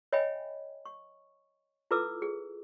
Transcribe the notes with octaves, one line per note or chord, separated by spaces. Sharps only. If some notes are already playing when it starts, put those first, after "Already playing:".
C#5 D#5 E5 G5 G#5 B5
C#6
E4 F4 A4 B4 D6 E6
G#4